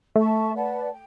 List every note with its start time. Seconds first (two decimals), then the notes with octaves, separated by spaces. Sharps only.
0.16 A3 A4 E5 A5 C#6
0.54 B4 D5 F#5 A5
0.91 G5